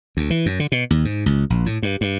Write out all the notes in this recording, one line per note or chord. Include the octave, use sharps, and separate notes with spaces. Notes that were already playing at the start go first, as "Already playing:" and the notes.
D2
E3
F#2
D3
B2
D#2
G#2
C#2
A#1
A2
G2
G2